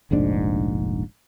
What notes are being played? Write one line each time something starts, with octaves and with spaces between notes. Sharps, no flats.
F1 A#1 G#2 D4